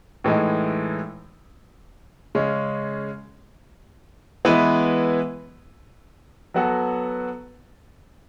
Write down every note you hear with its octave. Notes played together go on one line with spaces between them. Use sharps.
A2 E3 G#3 D#4
C#3 G#3 C#4
E3 G#3 B3 E4 B4
F#3 B3 F#4 A4